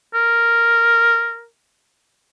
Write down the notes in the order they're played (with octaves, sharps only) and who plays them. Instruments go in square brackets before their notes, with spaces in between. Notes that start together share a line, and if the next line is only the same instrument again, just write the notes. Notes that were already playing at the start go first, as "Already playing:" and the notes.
[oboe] A#4